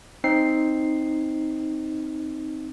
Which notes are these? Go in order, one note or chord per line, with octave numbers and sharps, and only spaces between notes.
C4 D#4 C7